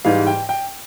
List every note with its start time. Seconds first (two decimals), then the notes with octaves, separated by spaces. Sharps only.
0.05 G#2 E3 G3 F5
0.27 G5
0.49 G5